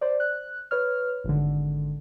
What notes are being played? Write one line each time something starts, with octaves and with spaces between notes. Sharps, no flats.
C5 D5
F#6
B4 C#5 F6
G#1 D3